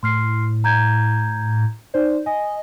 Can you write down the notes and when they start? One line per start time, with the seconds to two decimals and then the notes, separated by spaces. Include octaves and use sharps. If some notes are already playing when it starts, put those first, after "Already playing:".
0.03 A2 C6 F6 C7
0.64 A#5 G6 G#6
1.94 D#4 C5 D5
2.26 D#5 G#5